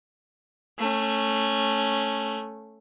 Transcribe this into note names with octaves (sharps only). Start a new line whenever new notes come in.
A3 C#4